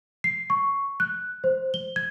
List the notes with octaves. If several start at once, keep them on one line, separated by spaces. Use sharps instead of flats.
C7
C#6
F#6
C5
G7
G#6